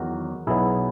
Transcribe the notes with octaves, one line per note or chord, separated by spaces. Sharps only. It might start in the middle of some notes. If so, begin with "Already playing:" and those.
Already playing: E2 D#3 F#3 F#4 A#4
B1 B2 F#3 B3 E4 G#4